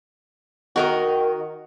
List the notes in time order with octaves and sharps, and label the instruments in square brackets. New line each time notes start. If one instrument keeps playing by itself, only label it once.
[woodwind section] D#3 [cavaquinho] F#4 A#4 D#5